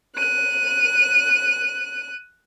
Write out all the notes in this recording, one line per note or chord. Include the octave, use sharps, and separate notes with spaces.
F#6 D#7